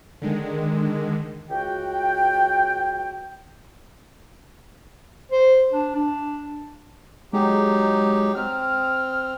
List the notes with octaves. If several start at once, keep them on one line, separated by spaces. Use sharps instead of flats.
D3 D#3 G#3
C#2 F#4 G5
C5
D4
D4
F#3 G#3 D#4 G4
C4 F6